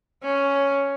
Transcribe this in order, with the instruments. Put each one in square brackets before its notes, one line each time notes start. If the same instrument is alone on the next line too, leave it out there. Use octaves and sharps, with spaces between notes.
[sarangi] C#4